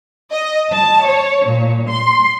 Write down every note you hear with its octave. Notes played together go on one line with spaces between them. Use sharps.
D#5
A5
C#5
A#2
C6